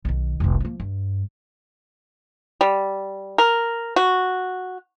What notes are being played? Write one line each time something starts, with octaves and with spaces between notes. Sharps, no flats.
B1 D#3
F1 C2
F3 A#3
G2
G3
A#4
F#4